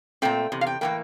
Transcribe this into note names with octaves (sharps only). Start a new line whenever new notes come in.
A#2 F3 A3 C4 G5
E2 C3
F5
G5
A2 E3 G3 A#3 G5